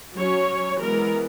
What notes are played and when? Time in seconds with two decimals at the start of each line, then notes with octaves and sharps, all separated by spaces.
0.15 F#3 C#4 C#5
0.79 E3 G#3 B3 A#4